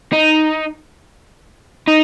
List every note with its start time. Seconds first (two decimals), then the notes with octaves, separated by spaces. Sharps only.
0.13 D#4
1.88 D#4